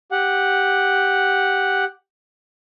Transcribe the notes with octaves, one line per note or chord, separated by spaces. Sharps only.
G4 F#5